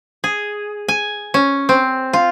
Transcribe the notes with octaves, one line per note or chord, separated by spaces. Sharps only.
G#4
G#5
C#4
C4
F4